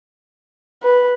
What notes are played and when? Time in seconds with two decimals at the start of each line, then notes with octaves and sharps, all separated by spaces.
0.83 B4